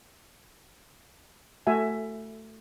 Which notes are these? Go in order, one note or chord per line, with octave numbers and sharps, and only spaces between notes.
A3 F#4 E5 G#5